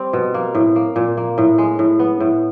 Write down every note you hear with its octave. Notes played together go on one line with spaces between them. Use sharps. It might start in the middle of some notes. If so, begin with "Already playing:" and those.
Already playing: G3 C4
B2
A#3
A2
A#3
A#2
A#3
A2
G#3
A2
B3
A2